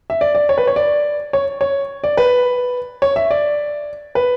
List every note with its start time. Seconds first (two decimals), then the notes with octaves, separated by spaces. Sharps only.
0.10 E5
0.21 D5
0.35 D5
0.49 C#5
0.58 B4
0.67 C#5
0.76 D5
1.33 C#5
1.61 C#5
2.04 D5
2.17 B4
3.02 C#5
3.16 E5
3.31 D5
4.15 B4